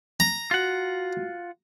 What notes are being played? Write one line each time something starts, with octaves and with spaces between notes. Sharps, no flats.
A#5
F4 F#4 F#5